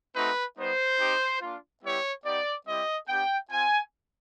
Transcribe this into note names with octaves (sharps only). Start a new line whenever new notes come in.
A3 C4 D#4 F#4 B4
G3 B3 D#4 C5
C4 D#4 G4
A#3 D4 F4
G3 B3 E4 G4 C#5
B3 D#4 G4 D5
G3 C4 E4 G4 D#5
B3 D4 G4 G5
C4 F4 G#5